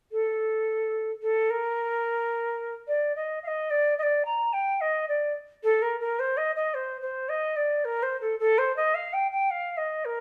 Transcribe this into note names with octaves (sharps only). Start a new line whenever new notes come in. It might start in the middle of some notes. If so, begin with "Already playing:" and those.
A4
A4
A#4
D5
D#5
F5
D#5
D5
D#5
D5
A#5
G5
D#5
D5
A4
A#4
A#4
C5
D#5
D#5
C5
C5
D#5
D5
A#4
C5
A4
A4
C5
D#5
F5
G5
G5
F5
D#5
A#4